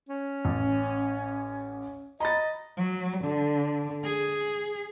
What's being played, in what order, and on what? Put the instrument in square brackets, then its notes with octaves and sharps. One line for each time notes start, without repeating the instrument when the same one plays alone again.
[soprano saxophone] C#4
[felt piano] A1
[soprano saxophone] D#5 [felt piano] A#5 B5 A6
[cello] F#3
D3
G#4